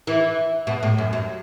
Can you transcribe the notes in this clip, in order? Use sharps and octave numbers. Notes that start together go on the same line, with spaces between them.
E3
B2
A2
F#2
F#2